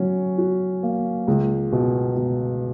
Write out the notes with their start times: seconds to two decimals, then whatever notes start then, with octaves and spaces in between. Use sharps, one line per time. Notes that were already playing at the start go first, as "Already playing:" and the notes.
Already playing: F#3 C#4
0.38 F#4
0.83 A#3
1.28 C#2
1.72 B2
2.17 B2